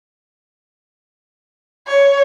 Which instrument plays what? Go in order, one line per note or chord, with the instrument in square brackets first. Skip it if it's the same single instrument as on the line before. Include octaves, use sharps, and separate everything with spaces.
[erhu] C#5